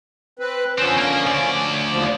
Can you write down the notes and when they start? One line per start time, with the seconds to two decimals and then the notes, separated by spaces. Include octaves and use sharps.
0.39 C4 B4
0.78 D3 F3 C4 C#4 A4
0.98 A#3
1.27 D2 D5
1.89 D#2 F3